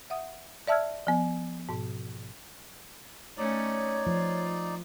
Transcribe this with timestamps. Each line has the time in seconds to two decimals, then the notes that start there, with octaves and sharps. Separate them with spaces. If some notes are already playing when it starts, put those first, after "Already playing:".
0.10 E5 F#5 D#6
0.67 D5 E5 A5 E6 F6 G#6
1.07 F3 B3
1.69 G#2 B2
3.38 A3 C#4 D#4 C#5 D5
4.07 F3 F4